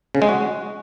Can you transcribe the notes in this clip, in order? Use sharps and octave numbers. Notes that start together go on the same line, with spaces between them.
C#3
G#3
F#4